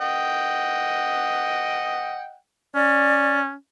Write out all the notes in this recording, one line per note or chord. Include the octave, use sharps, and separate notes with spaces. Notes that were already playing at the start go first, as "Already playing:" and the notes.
D#5 F#5 G5
C#4 D5